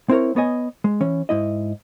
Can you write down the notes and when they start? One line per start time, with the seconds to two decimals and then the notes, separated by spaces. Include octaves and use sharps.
0.09 C4 E4 A#4 C#5
0.36 B3 C#5 D#5 G#5
0.84 G#3
1.01 E3 C#4
1.29 G#2 E4 D#5